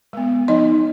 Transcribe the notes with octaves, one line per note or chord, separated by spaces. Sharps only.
G#3 B3
F3 D#4 D#5